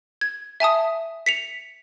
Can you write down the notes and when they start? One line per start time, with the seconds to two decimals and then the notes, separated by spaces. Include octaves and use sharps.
0.21 G#6
0.60 E5 G#5 A5 D#6
1.26 B6 C#7 F7